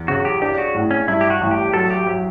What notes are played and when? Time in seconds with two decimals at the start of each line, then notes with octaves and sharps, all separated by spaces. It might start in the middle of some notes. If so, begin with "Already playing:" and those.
Already playing: E2
0.08 C#3 F#4
0.25 G4
0.42 D4 G4
0.58 F#4
0.74 A2
0.91 C#4
1.07 G2 E4
1.21 G4
1.30 F#4
1.41 A1
1.51 G4
1.74 F#3 A4
1.90 G4
2.07 F#3